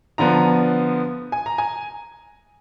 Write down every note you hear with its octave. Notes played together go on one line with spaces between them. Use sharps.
D3 F3 B3 A#5
G#5
A#5
G#5